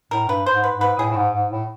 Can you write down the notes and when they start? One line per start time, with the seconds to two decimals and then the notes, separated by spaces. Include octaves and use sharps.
0.11 A2 A#4
0.28 G2 B4
0.46 C5
0.51 G#2
0.64 B4
0.76 G#2
0.81 B4
0.98 A2 G#4
1.10 A2
1.16 G#2
1.33 G#2
1.51 A2